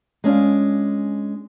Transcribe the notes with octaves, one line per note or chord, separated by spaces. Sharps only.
G#3 C#4 D4 F4